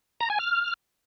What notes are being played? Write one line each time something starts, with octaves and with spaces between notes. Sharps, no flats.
A#5
G#5
F6